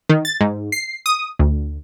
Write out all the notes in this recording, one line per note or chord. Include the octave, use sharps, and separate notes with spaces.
D#3
A6
G#2
C7
D#6
D2